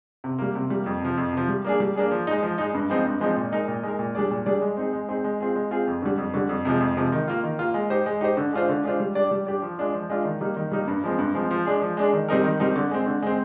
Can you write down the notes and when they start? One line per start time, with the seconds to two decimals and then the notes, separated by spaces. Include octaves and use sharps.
0.24 C3
0.39 G3 A#3
0.55 C3
0.70 G3 A#3
0.86 F2
1.01 C3 F3
1.17 F2
1.33 C3 F3
1.49 G3
1.64 A#3 D4 G#4
1.80 G3
1.96 A#3 D4 G#4
2.11 F3
2.27 G#3 D#4
2.43 F3
2.58 G#3 D#4
2.74 G2
2.90 F3 G#3 C4 D#4
3.05 G2
3.20 F3 G#3 C4 D#4
3.37 A#2
3.52 G#3 D#4 A#4
3.68 A#2
3.83 G#3 D#4 A#4
3.99 A#2
4.15 G3 D4 G#4 D5
4.31 A#2
4.46 G3 D4 G#4 D5
4.62 G#3
4.77 C4 D#4 G#4
4.93 G#3
5.09 C4 D#4 G#4
5.24 G#3
5.40 C4 F4 G#4
5.56 G#3
5.71 C4 F4 G#4
5.87 F2
6.02 D3 G3
6.18 F2
6.34 D3 G3
6.49 F2
6.65 C3 F3 G#3
6.80 F2
6.97 C3 F3 G#3
7.12 D#3
7.28 A#3 F4
7.44 D#3
7.59 A#3 F4
7.74 G#3
7.90 D#4 G4 C5
8.06 G#3
8.21 D#4 G4 C5
8.37 D3
8.53 G#3 D4 F4 C5
8.69 D3
8.84 G#3 D4 F4 C5
9.00 G3
9.15 D4 G4 D5
9.31 G3
9.47 D4 G4 D5
9.62 F3
9.78 G#3 D4 F4
9.94 F3
10.10 G#3 D4 F4
10.25 D#3
10.41 G3 A#3 D#4
10.56 D#3
10.72 G3 A#3 D#4
10.87 G2
11.04 F3 G#3 C4
11.19 G2
11.35 F3 G#3 C4
11.51 F3
11.65 G#3 D4 G#4
11.82 F3
11.97 G#3 D4 G#4
12.13 D#3
12.29 G3 C4 D#4 A#4
12.44 D#3
12.60 G3 C4 D#4 A#4
12.76 D3
12.91 G#3 C4
13.06 D3
13.22 G#3 C4